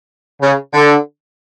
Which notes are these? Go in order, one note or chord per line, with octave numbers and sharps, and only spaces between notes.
C#3
D3